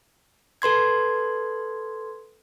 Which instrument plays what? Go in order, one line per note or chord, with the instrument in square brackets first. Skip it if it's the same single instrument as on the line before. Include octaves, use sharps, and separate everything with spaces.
[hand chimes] A4 B4 C6 G#6